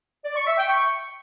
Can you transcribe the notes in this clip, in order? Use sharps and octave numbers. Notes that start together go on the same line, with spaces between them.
D5
C#6
E5
G5
C#6